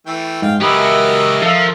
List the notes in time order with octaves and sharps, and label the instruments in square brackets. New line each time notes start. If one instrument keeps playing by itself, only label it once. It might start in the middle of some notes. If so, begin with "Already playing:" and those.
[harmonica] E3 A3 G5
[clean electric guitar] G#2 [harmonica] F5 G5
[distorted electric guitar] C#2 F#3 [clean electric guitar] G4 B4 [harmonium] A#4 E5 [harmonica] D#5
[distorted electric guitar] F3 [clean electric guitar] A4 F5